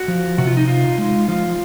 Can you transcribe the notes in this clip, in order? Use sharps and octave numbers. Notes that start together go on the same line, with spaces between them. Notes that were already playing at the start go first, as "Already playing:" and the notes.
Already playing: F#4
F3
C3 F#4
F4
D#4
D#4 F4
G#3
F3 F4